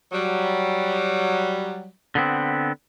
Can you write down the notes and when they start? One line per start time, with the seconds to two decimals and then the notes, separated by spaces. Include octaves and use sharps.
0.12 F#3 G3
2.15 D3 B3 C4